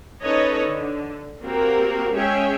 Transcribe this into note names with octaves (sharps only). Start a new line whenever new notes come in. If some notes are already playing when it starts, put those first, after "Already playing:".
C#4 D#4 A4 B4 C#5 D#5
D3
A#3 C4 F#4 G4 A#4
G#3 C#4 G#4 C#5 E5 G5